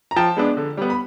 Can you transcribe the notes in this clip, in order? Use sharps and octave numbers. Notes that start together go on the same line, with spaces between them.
A#5
F3 G5 A5
G#3 B3 D4
D3
G3 B3
B5